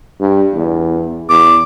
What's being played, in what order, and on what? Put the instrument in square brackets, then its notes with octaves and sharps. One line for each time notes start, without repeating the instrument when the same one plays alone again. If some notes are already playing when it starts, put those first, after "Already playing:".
[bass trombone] G2
E2
[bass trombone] E2 [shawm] D6